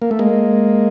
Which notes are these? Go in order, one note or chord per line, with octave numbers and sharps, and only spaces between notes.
A#3
A3
G#3 A#3